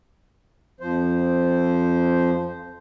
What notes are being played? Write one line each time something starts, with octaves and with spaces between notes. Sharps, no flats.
F2 F3 C5